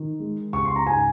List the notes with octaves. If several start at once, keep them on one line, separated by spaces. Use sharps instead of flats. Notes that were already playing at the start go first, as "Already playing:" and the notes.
Already playing: D#3
G#3
C#2 C#6
C6
A#5
G#2 G#5